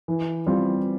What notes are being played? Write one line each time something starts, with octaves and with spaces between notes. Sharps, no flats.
E3
G3 C4 F4